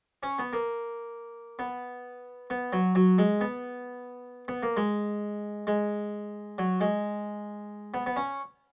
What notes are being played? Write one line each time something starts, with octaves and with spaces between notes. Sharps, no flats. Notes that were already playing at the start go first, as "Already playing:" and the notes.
C#4
B3
A#3
B3
B3
F#3
F#3
G#3
B3
B3
A#3
G#3
G#3
F#3
G#3
B3
B3
C#4